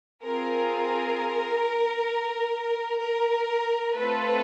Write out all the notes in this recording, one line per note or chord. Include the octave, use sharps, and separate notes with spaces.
C4 F4 G#4 A#4
A#4
A3 C4 F4 A4 B4